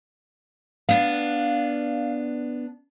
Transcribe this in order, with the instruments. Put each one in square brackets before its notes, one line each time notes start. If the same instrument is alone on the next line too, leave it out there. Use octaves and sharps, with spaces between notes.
[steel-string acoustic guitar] B3 D4 [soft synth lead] F5